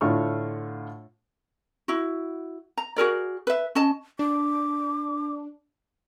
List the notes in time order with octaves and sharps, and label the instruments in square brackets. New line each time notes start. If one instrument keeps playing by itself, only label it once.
[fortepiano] A2 D3 A3 F4 C#6 F6
[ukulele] E4 F#4
A#5
F#4 G#4 A#4 D5
B4 E5
C#4 D#5 A5
[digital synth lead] D4 [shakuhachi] D6